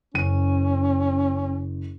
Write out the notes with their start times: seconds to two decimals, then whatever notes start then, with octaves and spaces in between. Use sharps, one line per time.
0.14 F#1 C#4 D#7